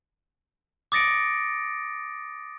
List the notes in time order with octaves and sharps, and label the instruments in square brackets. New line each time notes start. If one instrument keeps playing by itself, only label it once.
[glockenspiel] D6 D#6 A6 A#6 C#7 D7